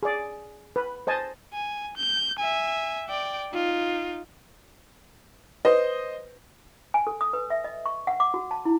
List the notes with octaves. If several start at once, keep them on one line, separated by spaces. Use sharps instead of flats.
G#4 D5
B4
C5 D#5 G#5 A5
G#5
G6
E5 G#5
D5 G5
D#4 F4
B4 C5 D#5
G#5
A4
D#6
B4
E5
D#5
C#6
F#5
D6
F#4
A5
E4